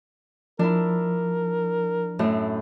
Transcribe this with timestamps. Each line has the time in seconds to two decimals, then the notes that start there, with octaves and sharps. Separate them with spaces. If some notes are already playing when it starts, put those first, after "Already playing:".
0.59 F3 D4 E4 A#4
2.19 F#2 A2